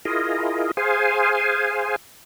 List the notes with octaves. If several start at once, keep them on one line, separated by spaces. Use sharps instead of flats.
E4 F4 G#4 A#4 D#5
G#4 C5 F5 G#5